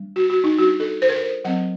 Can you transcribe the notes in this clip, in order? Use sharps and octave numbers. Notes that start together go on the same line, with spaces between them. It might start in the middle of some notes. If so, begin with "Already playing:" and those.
Already playing: G3 D4
F#4
F#4
D#4
G3 D4 F#4
A4
C5
A#4
C5
F#3 C4 F#5